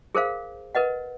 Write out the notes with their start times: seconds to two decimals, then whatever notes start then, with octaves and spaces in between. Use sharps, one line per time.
0.15 G#4 A#4 C5 F5
0.75 A#4 B4 D#5 F#5